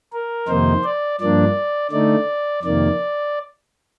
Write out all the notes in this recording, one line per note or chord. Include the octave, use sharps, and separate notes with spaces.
A#4
F2 C3 D#3 A#3 D#4 C5
D5
G2 F3 A#3 D4 D5
D3 A3 D#4 D5
F2 C3 D#3 A#3 D5